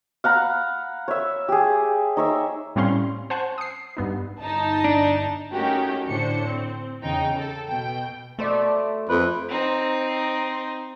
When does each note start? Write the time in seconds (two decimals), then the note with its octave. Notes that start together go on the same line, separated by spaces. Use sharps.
0.24 F5 F#5 A#5 B5
1.08 C#5 E5
1.49 G4 G#4
2.17 D#4 C#5 E5
2.76 A2 G3 C4 C#4 F5 C6
3.30 C5 F#5 G#5 A5 C#6 F#6
3.58 D#6 C7
3.97 G2 B3 D#4
4.41 G1 D#4 A5
4.84 D4
5.51 A3 C#4 D#4 F#4 G4 A#4
6.07 A2 D3 D4 C5 C#7
6.46 C4
7.03 E2 C#3 D#4 G5
7.37 A4
7.68 B2 G5
8.39 B2 A3 C5 D5
9.10 F2 B4
9.48 C4 D#4